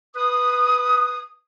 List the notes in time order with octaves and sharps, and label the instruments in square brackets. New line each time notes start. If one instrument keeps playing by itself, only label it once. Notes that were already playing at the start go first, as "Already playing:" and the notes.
[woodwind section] B4 D#6